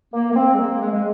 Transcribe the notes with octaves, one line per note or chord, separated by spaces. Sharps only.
A#3
A#3
C4
G#3
A#3
G#3
G#3